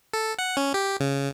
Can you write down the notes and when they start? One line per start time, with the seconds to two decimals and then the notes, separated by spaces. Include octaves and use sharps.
0.14 A4
0.39 F#5
0.57 C#4
0.74 G4
1.00 C#3